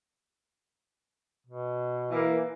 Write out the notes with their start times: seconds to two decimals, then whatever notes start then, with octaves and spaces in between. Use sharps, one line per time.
1.47 B2
2.11 E3 A#3